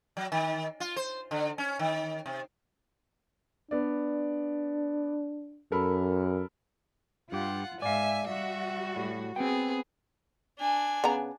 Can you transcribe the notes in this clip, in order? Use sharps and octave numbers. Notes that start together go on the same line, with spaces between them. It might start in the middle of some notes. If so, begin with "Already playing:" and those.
F#3
D#3
F4
C5
D3
C#4
D#3
C3
B3 D4 D5
F#2 A4 A#4 B5
G2 F4 G4 F#5
G#2 D5 E5 F5 G#5
G3 F#4 E5
A2
B3 C4 G#4 G5
D4 G#5
C#3 B3 A#5